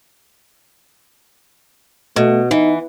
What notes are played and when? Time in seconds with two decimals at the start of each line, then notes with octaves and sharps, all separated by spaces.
2.16 B2 A3
2.51 E3 D#4